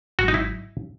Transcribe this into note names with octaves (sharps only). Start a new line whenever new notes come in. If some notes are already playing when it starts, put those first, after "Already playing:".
G#1 G#2 F#3 F#4
D#4
E4